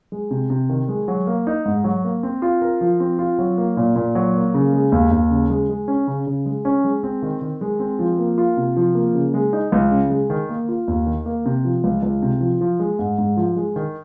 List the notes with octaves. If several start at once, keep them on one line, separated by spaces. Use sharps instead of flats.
G#3
C3
C3
D#3
G#3
F#3
A#3
D#4
G#2
F#3
A#3
C4
F4
A#4
F3
C4
F4
F#3
A#3
A#2
A#2
F#3
A#3
C#3
G#3
D#2
D#2
C#3
G#3
G#3
C#4
C#3
C#3
G#3
C#4
G#3
C4
D#3
D#3
G#3
C4
F3
A#3
F4
C3
F3
A#3
C#3
G#3
D#4
C#2
C#3
G#3
D#3
A#3
F4
D#2
D#3
A#3
C3
F3
C#2
C#2
C3
F3
F3
G#3
G#2
G#2
F3
G#3
D#3